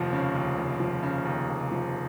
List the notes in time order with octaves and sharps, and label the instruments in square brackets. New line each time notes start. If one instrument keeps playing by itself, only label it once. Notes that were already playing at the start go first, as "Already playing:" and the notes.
Already playing: [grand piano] F1 D#2 F3
C#3
D#2
F1
F3
C#3
D#2
F1
F3